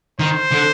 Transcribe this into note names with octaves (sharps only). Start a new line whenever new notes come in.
D#3 C5
D3